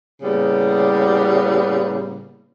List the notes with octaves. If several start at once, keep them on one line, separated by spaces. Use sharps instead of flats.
A2 C#3 G3 A#3 B3